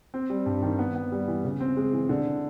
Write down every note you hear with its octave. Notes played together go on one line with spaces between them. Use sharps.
C4
G3
G2
D#3
B3
B3
G3
E3
C#3
C4
G#3
E3
D3